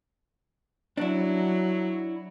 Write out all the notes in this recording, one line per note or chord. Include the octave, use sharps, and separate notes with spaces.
F#3 D4 E4